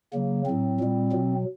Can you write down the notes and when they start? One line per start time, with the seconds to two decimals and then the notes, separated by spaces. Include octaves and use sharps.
0.13 C#3 F#3 A#3
0.46 A2 F#3 C4
0.80 A#2 G3
1.12 B2 F#3